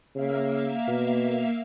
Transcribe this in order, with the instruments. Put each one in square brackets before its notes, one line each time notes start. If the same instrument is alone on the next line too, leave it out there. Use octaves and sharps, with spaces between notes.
[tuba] C#3 [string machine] A#3 E5 F5
[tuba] B2